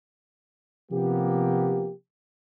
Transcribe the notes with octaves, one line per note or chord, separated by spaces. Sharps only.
C3 F3 A#3 B3 G4